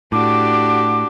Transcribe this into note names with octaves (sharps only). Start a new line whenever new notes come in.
A2 D4 F#4 G4 D6